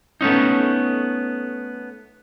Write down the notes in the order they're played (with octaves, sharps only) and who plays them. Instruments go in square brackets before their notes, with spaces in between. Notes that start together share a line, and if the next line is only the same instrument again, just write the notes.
[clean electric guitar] A3 B3 C#4 D#4